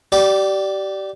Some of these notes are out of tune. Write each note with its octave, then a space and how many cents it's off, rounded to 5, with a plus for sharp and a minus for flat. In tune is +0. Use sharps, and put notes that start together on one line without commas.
G4 -30 D5 +0